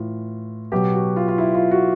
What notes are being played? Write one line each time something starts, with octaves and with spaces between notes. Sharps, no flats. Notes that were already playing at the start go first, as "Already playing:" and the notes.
Already playing: A2 E3 F4
B2 F#3 G4
F#4
F4
F4
E4
F4
F#4